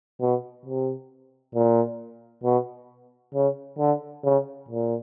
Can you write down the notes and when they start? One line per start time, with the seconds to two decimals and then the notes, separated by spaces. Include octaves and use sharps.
0.21 B2
0.65 C3
1.55 A#2
2.44 B2
3.34 C#3
3.78 D3
4.24 C#3
4.69 A#2